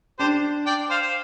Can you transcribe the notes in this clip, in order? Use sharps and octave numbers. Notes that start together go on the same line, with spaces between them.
D4 G4 C5
D5 G5
C5 F5
C5